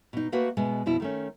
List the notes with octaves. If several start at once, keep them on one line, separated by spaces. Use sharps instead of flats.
B2 D#4
A3 A#3 F#4 B4 F#5
B2 G#3 B3 E5
F2 B2 E4
D#3 A3 C#4